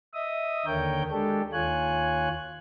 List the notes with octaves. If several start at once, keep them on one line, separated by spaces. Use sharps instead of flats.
D#5 E5 D#6
D#2 D3 A#4 C#5 G5 G6
G#3 D4 G4 A4
D#2 F4 C#5 G#5 F#6